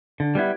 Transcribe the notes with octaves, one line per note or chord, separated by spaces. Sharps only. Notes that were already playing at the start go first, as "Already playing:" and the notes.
D3
G3 B3 E4